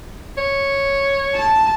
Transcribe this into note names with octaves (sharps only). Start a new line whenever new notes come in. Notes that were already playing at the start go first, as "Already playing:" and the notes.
C#5
A5